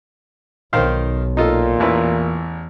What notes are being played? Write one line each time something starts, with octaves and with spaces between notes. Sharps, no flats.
B1 D#3 C5 F5
A#2 D#4 F4 A4
A1 E2 E4 B4